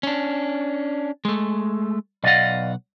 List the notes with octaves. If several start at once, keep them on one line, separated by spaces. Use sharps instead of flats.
C#4 D4
G#3 A3
B1 D5 D#5 F5 F#5